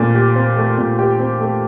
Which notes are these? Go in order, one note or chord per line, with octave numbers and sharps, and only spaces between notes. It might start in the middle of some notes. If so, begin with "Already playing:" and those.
Already playing: A#2 A3 C4
G4
C4
A3
A#2
G4
C4
A3